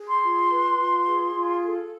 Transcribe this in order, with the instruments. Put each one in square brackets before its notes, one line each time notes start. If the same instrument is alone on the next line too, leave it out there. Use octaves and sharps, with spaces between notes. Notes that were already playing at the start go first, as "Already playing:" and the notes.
Already playing: [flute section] G#4
C6
F4
B4
F4
G#4
F4
A4